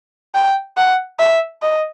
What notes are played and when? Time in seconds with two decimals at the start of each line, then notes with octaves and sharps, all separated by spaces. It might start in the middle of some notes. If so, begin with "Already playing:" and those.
0.35 G5
0.77 F#5
1.19 E5
1.62 D#5